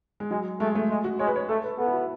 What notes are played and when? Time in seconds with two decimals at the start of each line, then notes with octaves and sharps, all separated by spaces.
0.20 G#3
0.31 F#3 G#3
0.60 G#3 A3
0.75 A3
0.90 G#3
1.04 F#4
1.19 G#3 C#5
1.27 B4
1.36 C#5
1.49 A3 A4
1.64 B4
1.78 B3 A4
1.86 E4
1.93 F#4